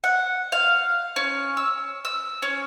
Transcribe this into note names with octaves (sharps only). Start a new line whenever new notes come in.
F#5
F5
C#4
E6
E6
C#4